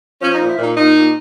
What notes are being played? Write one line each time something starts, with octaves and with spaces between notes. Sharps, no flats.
F3 C#4
D#4
A#2
E4
A#2
D#4
A#2 D#4
A#2